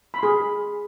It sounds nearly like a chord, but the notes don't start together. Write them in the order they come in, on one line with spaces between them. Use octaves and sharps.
B5 C6 G#4